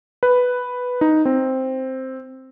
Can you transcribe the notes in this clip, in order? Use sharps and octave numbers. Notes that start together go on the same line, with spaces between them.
B4
D#4
C4